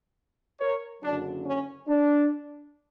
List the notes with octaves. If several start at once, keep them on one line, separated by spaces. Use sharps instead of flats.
A#4 C#5
F#1 F#2 D3 F#3 D4
C#4
D4